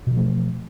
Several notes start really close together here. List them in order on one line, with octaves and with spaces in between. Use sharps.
B2 E3 F3 A3